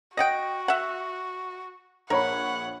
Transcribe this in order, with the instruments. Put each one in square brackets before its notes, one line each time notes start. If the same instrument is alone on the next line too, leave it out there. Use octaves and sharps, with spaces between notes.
[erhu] F#4 [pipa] D#5 F#5 G5 [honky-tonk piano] A#6
[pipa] E5 F#5
[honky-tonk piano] A#1 C#5 B5 [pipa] A#4 [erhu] F#5